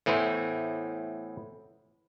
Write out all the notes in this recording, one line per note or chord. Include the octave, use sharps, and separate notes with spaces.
A2 E3 B3 E4 C5